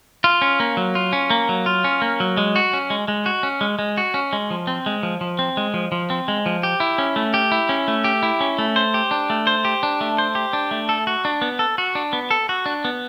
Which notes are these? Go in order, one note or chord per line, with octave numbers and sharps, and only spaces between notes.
F4
C#4
A#3
F#3
F4
C#4
A#3
F#3
F4
C#4
A#3
F#3
G#3
F#4
C#4
G#3
G#3
F#4
C#4
G#3
G#3
F#4
C#4
G#3
F3
C4
G#3
F3
F3
C4
G#3
F3
F3
C4
G#3
F3
G4
E4
C#4
A3
G4
E4
C#4
A3
G4
E4
C#4
A3
C5
G4
D4
A3
C5
G4
D4
A3
C5
G4
D4
A3
A4
F#4
D4
B3
A4
F#4
D4
B3
A4
F#4
D4
B3